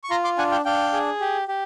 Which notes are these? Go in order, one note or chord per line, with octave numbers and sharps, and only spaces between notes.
C#6
F4 A#5 C6
C6 D6
D4 F#5 G#5
F5 G5
D4 F5 G5
G#4
G4
G4